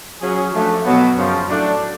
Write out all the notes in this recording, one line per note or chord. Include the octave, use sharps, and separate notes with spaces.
F#3 C#4 G#4
F3 A3 D4
B2 F#3 B3
F#2 C#3 F3
A2 F#3 A3 D4